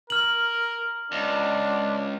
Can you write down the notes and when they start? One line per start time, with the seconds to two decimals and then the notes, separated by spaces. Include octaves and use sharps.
0.10 A#4 F6 F#7
1.12 C#2 D4